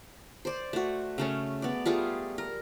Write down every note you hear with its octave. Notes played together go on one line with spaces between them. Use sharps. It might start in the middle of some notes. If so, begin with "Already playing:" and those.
C5 D5
A3 F#4
C#3 A3 C#4
B3 D5
G3 A3 F4 G#4
A#4